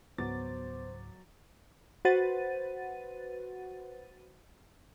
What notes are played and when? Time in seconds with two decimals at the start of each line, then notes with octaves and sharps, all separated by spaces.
0.18 C#2 G#2 F#3 B3 F#4 C5 D6 A6
2.05 F#4 B4 C5 F#5 A6 D#7